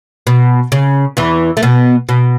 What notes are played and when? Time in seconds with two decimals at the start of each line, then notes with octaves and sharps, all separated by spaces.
0.27 B2
0.72 C#3
1.17 E2 E3
1.57 A3
1.63 B2 B3
2.09 B2